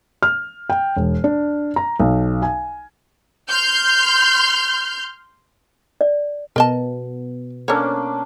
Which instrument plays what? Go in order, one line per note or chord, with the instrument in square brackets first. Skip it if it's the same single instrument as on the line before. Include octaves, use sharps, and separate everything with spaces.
[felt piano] F6
G5
E1
D4
A#5
B1
G#5
[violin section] C6 F6 G6
[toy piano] D5
[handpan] B2 B3 [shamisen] A#4 D#5 A5
[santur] A#3 C#4 D4 [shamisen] A4 C#5